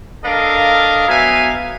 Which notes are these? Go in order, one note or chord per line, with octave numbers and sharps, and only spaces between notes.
D4 A4 A#4 D#5 F5
F#3 B3 E5 F5 G#5